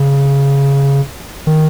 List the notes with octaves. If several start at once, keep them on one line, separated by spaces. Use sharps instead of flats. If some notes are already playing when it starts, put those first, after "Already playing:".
Already playing: C#3
D#3